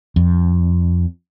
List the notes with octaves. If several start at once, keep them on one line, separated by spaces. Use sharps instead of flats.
F2